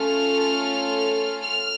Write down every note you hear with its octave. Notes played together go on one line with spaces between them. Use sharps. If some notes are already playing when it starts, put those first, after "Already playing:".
Already playing: A3 C#4 F4 A4 F6
F6